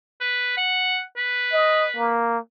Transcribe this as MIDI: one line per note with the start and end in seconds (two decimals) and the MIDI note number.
0.21 0.57 71
0.57 1.01 78
1.17 2.22 71
1.52 1.85 75
1.96 2.38 58